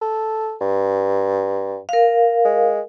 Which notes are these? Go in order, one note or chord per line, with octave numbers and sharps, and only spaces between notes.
A4
G2
A#4 F5
G#3